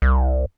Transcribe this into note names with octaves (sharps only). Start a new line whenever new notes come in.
C2